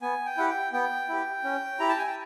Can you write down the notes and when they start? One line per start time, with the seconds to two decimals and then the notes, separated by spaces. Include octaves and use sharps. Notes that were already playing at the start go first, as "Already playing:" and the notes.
0.02 B3 G#5
0.26 G5
0.37 E4 G4 F#5
0.50 G5
0.73 B3 G5
1.09 E4 G4
1.44 C#4
1.80 E4 G4 A#5
1.89 A5
1.98 G#5
2.06 G5